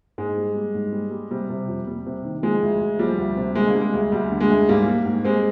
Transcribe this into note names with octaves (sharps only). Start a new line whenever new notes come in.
G#2 G#3
G3
G3
G#2
G3
G3
C3 G3
C3
F2
G3
C3
D#3
F3 G#3
D2
D2
F3 G3
D2
C3
D3 G#3
A#3
G3
G#3
D2
D2 G3
D3
G#3
D2
G#2 G3 A#3
G3
G#2
G3 G#3 C4